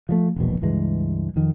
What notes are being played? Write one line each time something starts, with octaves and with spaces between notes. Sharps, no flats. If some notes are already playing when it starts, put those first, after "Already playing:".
F3 F#3 A3
E1 A#1 B2
C#2 G2 E3 G#3
F2 D#3